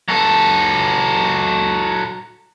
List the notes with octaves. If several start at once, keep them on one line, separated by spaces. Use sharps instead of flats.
F#3 A4